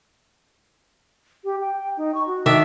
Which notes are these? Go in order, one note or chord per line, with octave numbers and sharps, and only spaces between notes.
G4
G5
D#4
C#6
F#4
D#3 D4 E5